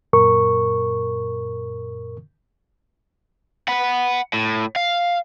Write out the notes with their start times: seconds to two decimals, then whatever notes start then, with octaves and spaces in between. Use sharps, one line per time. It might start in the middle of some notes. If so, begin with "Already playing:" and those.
0.13 F#2 A#2 A#4 C#6
3.68 F#5 B5
4.33 A2
4.76 F5